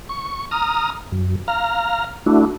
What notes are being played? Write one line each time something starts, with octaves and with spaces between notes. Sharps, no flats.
C#6
A#5 D#6 F6
F#2
F5 A#5 F6
A3 D4 E4 F#4